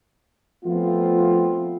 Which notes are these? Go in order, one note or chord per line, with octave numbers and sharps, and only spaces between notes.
F3 A3 B3 C4 F4